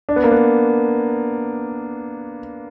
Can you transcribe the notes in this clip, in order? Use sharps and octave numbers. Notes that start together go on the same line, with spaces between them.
D4
B3
A#3
B3